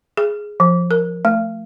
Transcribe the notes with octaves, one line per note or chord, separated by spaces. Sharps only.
G#4
F3
A#4
A3